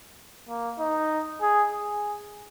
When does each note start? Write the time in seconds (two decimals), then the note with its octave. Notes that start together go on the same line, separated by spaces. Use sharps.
0.49 A#3
0.79 D#4
1.41 G#4
1.72 G#4